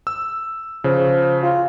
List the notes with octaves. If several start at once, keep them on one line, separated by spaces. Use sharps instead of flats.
E6
C#3 F3
F4